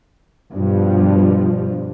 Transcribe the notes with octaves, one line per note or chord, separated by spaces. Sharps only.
G2 B2 F3